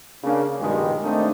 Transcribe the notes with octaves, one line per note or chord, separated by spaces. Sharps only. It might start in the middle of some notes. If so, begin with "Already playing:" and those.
C#3 A#3 D4
A#1 G2 B2 D#3 G3 G#3
A3 A#3 C4 D4 D#4